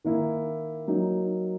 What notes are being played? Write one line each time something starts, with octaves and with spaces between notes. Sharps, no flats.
D#3 A#3 E4
F#3 A#3 D#4